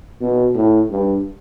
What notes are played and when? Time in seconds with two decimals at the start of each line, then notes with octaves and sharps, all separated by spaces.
0.21 B2
0.55 A2
0.90 G2